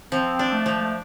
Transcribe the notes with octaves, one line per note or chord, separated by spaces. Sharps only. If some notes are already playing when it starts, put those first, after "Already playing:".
F3 C4
D4
A3
F3
A3